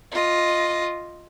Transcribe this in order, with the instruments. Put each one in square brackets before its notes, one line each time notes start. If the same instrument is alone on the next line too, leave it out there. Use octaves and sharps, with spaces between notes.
[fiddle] F4 D#5